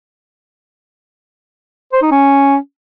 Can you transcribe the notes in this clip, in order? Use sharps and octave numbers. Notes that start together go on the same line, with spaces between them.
C5
D#4
C#4